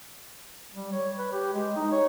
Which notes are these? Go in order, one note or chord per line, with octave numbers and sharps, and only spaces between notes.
G3
C#5
B4
G4
G#3
D#4
C#5